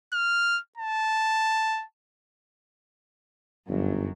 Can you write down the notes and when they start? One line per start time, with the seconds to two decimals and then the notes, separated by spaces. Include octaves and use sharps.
0.13 F6
0.78 A5
3.69 G1 F#2